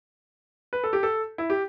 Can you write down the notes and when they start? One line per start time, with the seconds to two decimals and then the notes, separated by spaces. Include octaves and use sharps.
0.73 B4
0.84 A4
0.93 G4
1.03 A4
1.38 E4
1.50 G4